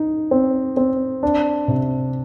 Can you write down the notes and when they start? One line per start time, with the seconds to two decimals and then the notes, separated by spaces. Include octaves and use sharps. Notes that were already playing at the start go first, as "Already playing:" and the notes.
Already playing: D#4
0.31 C4
0.77 C4
1.23 D4
1.68 C3